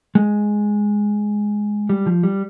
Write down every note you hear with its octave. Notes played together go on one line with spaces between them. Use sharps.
G#3
G3
F3
G3